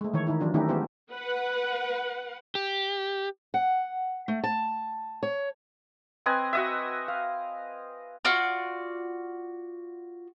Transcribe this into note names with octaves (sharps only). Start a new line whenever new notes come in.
G#3 A3
D#3 E3 C#5
D#3 D#4 E4
E3 F#3 D4 F4
D#3 A3 C#4 D#4 E4 G4
G#3 B3 F4 G4 C5
B4 F#5
G4
F#5
A3
A5
C#5
C4 B4 D#5 G#5
F#4 D#5 E5
F5
F4 F#4 D5